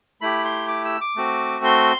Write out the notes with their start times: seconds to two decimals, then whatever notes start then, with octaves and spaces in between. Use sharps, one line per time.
0.21 A3 E4 G4 B5
0.44 C6
0.68 D6
0.85 E6
1.01 D6
1.16 A3 C4 F#4
1.65 C6